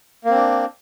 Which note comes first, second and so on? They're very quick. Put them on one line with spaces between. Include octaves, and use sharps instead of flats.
A#3 C4 D4